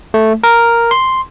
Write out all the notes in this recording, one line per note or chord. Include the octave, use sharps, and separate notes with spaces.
A3
A#4
C6